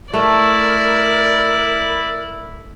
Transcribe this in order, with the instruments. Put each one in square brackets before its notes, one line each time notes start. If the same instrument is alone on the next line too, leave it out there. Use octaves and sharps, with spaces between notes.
[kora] A3 E5 [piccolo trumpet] E4 [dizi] A#4 [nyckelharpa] D5